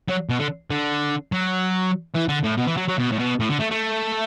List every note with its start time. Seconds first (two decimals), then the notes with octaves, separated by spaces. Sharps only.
0.09 F#3
0.30 B2
0.39 D3
0.71 D3
1.32 F#3
2.15 E3
2.28 D3
2.43 A2
2.57 B2
2.67 E3
2.77 F#3
2.88 F#3
2.98 B2
3.11 A2
3.19 B2
3.40 A2
3.50 D3
3.60 A3
3.71 A3